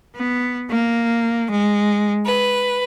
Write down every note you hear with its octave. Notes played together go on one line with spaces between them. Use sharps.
B3
A#3
G#3
B4